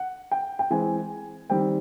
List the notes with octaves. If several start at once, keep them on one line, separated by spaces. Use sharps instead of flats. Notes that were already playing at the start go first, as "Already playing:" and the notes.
Already playing: F#5
G5
G5
E3 G#3 C4 G#5
D#3 G3 C4 G5